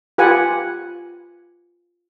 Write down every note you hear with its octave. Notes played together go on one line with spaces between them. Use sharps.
F4 G4 B4 F#5 G#5